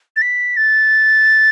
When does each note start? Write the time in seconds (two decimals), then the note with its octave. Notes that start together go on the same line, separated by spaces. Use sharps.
0.16 A6
0.22 B6
0.57 A6